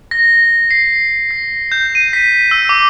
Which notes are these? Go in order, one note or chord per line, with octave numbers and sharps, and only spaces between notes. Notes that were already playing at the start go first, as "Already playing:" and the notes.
A#6
C7
A#6
G6
D#7
B6
E6
D6